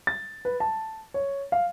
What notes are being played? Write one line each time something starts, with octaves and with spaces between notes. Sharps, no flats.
A6
B4
A5
C#5
F5